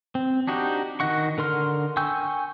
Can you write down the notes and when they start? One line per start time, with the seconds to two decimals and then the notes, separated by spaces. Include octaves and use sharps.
0.15 C4
0.48 D4 D#4 F#4 G4
1.00 D#3 F#4 D#5 F#5 C#6
1.38 D3 A#4 C6 F6
1.97 G5 G#5 C#6 E6 G6